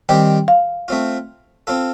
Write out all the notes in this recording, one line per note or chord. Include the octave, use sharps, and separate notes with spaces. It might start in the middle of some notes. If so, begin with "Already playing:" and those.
D#3 G3 C4 G4 C5 G5
F5
A3 C4 F4
C4 F4 A4